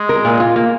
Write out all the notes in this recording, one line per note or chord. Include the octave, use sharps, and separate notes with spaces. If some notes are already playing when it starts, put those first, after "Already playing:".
Already playing: G#3
A#4
A#2
F4
A#3